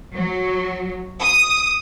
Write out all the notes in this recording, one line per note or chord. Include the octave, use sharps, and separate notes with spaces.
F#3
D#6